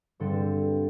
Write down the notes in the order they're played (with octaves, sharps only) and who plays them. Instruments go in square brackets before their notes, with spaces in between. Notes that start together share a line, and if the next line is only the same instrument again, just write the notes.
[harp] G2 D3 G3 C4 A4